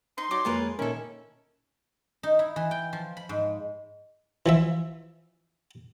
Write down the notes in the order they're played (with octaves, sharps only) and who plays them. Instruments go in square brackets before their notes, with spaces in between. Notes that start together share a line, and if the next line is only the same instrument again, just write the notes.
[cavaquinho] D#4 [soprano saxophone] C6
[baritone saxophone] F#3 [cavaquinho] D#4 D5 D6
[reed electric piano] F2 A#3 C#5 [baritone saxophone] G#3 [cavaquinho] F4 A#4 B4
[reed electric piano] A#2 A#4 [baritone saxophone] D#3 [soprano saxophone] C#4 [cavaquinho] E4 A4
[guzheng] D#4
E4
E3
G5
F3
B5
G#2
[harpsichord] E3 F3 E5